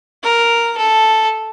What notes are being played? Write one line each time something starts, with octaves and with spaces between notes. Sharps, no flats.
A#4
A4